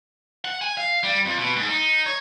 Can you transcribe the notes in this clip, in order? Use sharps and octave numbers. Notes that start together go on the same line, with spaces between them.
F#5
G#5
F5
G3
F2
B2
G#2
D#4
C#5